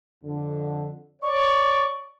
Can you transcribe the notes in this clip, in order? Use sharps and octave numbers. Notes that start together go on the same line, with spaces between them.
F2 D3
C#5 D5 C#6